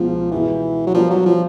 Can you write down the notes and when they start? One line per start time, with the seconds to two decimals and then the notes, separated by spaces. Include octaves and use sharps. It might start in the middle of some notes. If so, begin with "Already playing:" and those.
Already playing: C#2 B2 F3 G#3
0.31 B2 E3 G#3 B3
0.87 F#3
0.94 F3 G3 B3 D4 G4 A#4
1.10 F#3
1.26 F3